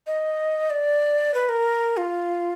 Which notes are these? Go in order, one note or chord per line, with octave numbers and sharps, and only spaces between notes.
D#5
D5
B4
A#4
F4